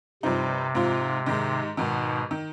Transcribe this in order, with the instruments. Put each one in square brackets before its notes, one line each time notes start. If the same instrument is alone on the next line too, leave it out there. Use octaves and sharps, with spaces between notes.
[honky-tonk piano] G2 F3 C4 D#4 [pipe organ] C3
[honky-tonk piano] G#2 F3 C4 F4
G#2 D#3 G#3
[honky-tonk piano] G#1 G#2 D#3 [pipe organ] B2
[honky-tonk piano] D#3